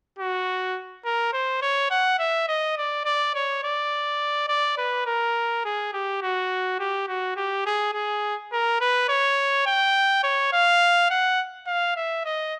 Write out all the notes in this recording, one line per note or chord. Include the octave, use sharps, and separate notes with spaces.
F#4
A#4
C5
C#5
F#5
E5
D#5
D5
D5
C#5
D5
D5
B4
A#4
G#4
G4
F#4
G4
F#4
G4
G#4
G#4
A#4
B4
C#5
G5
C#5
F5
F#5
F5
E5
D#5